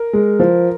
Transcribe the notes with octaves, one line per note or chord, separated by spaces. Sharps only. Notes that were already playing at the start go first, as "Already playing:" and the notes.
Already playing: A#4
G#3
F3